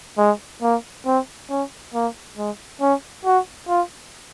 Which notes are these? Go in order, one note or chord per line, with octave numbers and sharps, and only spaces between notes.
G#3
A#3
C4
C#4
A#3
G#3
C#4
F#4
F4